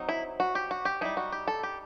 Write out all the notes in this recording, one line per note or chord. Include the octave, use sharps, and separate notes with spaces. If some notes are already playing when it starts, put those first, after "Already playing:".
Already playing: F#3 C4 D#4
E4
F#4
G4
F#4
G4
G3 D#4 E4
F#4
G4
A4
G4